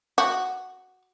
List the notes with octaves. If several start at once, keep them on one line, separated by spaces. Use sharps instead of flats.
F#4